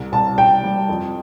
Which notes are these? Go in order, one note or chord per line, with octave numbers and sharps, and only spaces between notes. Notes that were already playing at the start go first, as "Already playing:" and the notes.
Already playing: C2
C2 A5
C2 G5
G3
F2